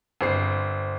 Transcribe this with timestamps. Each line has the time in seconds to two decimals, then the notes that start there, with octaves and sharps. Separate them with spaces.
0.21 G1 C4 C7